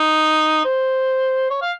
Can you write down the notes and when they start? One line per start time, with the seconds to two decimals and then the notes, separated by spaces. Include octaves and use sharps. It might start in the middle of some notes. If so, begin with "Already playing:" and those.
Already playing: D#4
0.65 C5
1.50 C#5
1.62 F5